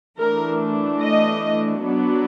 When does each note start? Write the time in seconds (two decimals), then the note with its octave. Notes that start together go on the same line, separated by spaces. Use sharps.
0.18 E3 A3 D4 A#4
1.01 D#5
1.84 F#3 B3 D4